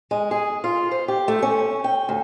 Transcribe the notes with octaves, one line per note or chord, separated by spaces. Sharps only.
G#3
G#4
F4
C5
G4
A3
C#4
G5
D2